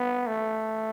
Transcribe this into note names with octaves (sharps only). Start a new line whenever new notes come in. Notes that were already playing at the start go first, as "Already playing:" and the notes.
Already playing: B3
A3